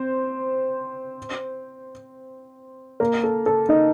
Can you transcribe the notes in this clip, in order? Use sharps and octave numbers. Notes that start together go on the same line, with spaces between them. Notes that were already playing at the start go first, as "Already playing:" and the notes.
Already playing: C4 C5
A#3 A#4
A4
A4
D#4 D#5